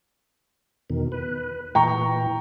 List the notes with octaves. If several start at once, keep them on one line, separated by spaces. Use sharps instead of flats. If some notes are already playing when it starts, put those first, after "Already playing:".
E2 B2 D#3
B4
A#2 E3 G5 A#5 C#6